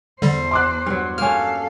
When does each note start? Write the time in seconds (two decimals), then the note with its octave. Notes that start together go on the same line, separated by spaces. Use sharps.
0.22 E2 D3 G3 C5
0.51 C6 D6 F#6
0.86 G2 F#3
1.18 A#3 C#4 A4 F5 F6